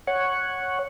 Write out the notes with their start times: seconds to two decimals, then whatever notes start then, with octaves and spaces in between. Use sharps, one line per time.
0.07 C#5 F#5